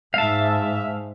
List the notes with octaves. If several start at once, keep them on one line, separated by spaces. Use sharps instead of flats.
G#2 E5 F5 A5